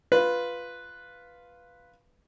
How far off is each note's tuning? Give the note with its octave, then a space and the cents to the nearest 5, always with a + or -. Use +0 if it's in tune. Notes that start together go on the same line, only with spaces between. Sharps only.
F4 +0 B4 +0